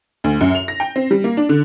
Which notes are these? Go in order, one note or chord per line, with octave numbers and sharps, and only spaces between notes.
D2
F#2
F7
A#6
G5
C4
G3
A#3
D4
D3